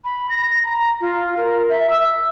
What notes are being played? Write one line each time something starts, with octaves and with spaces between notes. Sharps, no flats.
B5
A#6
A#5
F4
A#4
E5
E6